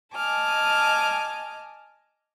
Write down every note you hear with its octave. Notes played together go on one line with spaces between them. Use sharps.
D#5 G#5 A5 D6 F6